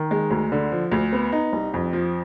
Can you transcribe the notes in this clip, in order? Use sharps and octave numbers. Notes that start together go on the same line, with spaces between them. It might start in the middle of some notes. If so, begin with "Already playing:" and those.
Already playing: D#3
G#3
D2
D3
F3
D2
B3
D#4
C2
F2
F3